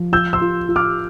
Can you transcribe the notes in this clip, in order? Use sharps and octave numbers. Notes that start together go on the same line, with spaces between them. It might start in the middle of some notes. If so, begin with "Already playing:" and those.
Already playing: F3
F4 E6 G6
C6 E6
F4
F4
D6 F6